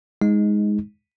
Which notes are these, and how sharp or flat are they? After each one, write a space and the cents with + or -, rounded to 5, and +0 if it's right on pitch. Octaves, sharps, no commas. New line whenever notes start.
G#3 +0 D#4 +15